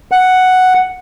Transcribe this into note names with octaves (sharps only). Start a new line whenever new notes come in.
F#5